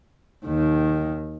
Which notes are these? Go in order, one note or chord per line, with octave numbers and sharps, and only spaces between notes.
D#2 D#3